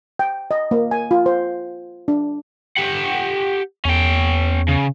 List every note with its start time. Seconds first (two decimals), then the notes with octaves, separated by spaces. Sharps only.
0.19 G5
0.51 D#5
0.71 A#3
0.91 G#5
1.11 F4
1.26 C5
2.08 D4
2.77 G4 F#5
3.85 E2 C#4 G5
4.68 C#3